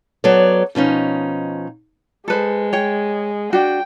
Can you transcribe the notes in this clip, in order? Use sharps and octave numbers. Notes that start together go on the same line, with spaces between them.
F#3 B3 A4 C#5 D5
B2 F3 C#4 D#4
G#3 A4 B4 C5
C#5 G5
D4 F#4 G5